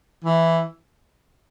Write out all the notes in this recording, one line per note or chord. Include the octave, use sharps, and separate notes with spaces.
E3